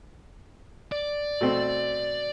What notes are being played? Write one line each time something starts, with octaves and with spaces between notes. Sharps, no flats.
D5
B2 A3 C4